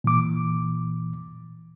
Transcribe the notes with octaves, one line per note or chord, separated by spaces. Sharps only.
A#2 E3 D6